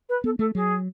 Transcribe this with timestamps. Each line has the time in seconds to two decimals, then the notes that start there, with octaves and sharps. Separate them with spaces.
0.09 B4
0.24 B3 A4
0.39 A3 A4
0.55 F#3 G#4